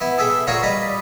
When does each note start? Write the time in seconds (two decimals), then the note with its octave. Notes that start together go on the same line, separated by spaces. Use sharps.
0.01 B3 E4
0.18 G#4 A4 E5 G5
0.47 A#2 F4 F#4 C#5 A#5 C#6
0.62 G3 B4 D#5 A#5